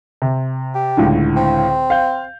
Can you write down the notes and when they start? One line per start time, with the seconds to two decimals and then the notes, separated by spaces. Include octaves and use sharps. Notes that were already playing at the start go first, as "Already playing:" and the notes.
0.22 C3
0.75 G4
0.97 C#2 A2 D3
1.37 C4
1.90 F5 G6